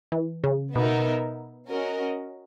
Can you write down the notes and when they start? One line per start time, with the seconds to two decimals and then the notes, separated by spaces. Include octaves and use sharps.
0.12 E3
0.44 C#3
0.75 B2 B3 D#4 A#4 E5
1.70 C#4 F#4 A#4 D#5